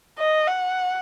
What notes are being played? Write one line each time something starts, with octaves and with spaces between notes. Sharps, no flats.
D#5
F#5